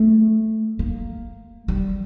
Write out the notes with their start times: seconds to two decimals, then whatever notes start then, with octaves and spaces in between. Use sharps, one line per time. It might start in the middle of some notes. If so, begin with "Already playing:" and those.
Already playing: A3
0.79 A#3
1.68 G3